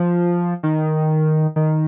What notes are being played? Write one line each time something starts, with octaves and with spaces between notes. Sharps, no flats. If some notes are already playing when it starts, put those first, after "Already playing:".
Already playing: F3
D#3
D#3